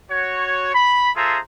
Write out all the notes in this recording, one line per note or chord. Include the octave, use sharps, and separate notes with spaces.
F#4 C#5
B5
F4 G#4 A4 C5 E5 A#5